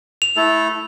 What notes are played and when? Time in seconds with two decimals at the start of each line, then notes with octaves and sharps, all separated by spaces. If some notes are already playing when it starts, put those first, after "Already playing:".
0.22 F7
0.37 A3 E4 A4